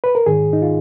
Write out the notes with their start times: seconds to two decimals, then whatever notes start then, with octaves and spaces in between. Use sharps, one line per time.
0.04 B4
0.15 A#4
0.26 G#2 D#3 G#4
0.53 D#4
0.62 F4